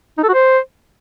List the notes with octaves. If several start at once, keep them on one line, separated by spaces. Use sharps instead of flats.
D#4
A4
F#4
C5